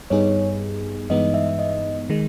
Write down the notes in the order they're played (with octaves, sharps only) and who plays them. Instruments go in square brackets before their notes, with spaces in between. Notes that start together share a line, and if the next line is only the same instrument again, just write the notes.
[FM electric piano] G2 G3 B3 D#4 G#4 [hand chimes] C#5
[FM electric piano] G2 E3 G#3 B3 D#4 [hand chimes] D#5
[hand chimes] E5
D#5
[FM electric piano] D#3 G#3